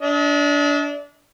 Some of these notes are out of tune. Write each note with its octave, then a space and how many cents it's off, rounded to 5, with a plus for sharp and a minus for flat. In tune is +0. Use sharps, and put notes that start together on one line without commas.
D4 -25 D#5 +40